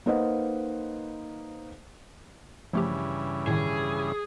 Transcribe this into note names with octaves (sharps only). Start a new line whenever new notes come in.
A#3 D#4 B4 C5 D#5 F#5
G2 C#3 E3 F3 A3 G4
A2 D#3 G#4